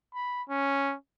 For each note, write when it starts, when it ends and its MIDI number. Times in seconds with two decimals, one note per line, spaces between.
0.14 0.43 83
0.49 0.95 61